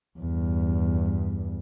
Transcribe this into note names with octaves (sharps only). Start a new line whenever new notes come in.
E2 G2